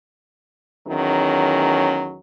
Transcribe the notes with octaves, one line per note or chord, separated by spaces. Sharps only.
E2 D#3 F#3 C#4